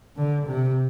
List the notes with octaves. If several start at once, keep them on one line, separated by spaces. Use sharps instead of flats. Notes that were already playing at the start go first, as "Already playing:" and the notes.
D3
C3